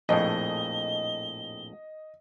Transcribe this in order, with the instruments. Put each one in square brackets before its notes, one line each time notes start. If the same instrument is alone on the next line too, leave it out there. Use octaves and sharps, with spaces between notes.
[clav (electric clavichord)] A#1 F2 A2 [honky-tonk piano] D#5 [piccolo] G7